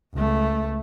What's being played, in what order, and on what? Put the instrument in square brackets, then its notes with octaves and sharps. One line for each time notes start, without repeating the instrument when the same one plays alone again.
[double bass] C#2 A3